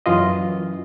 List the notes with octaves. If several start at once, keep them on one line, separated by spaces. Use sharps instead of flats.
F#2 E3 F4 D#5